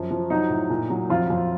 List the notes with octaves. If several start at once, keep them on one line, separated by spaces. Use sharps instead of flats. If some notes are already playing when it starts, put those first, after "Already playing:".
Already playing: F#2 F3
F3
F#3 D#4
A2
A#2
F#3
F2 F4
F2